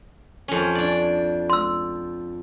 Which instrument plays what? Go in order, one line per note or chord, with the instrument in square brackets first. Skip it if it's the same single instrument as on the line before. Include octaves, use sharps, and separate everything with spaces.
[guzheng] F2 C#4
D4 D5
[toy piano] C6 E6